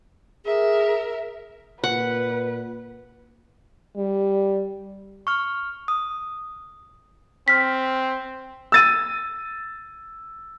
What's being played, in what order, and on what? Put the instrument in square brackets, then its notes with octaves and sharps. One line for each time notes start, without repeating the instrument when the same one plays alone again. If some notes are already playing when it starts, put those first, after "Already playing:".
[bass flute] G#4 [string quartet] A#4 E5
[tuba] A#2 [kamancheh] B4 [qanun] F#5
[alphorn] G3
[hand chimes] C#6 F6
D#6
[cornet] C4 [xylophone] F6 B6
[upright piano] E6 A6 D#7